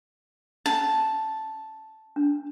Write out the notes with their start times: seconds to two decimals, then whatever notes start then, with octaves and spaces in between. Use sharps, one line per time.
0.66 C#4 A5
2.16 D4